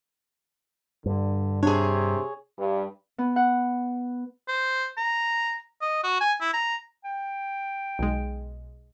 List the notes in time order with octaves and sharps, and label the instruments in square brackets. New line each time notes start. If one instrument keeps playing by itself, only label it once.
[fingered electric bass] G2 [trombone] D3
[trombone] C3 [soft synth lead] D4 [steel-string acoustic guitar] G#4 C#5
[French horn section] G2
[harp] B3
F#5
[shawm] C5
A#5
D#5
F#4
G#5
E4
A#5
[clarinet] G5
[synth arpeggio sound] B1 G#3